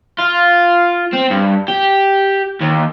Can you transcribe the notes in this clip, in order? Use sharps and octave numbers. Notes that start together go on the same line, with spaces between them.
F4
C4
G2
G4
D#2